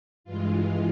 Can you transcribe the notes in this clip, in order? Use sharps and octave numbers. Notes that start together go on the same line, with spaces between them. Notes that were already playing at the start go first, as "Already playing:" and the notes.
G2 E3 G#3 F4